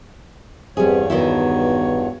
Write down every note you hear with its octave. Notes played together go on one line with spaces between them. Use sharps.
E2 G2 C3 G3 G#4 C#5
B2 D#3 D#4 E4